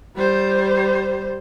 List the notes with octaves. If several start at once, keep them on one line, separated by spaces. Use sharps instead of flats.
G3 C5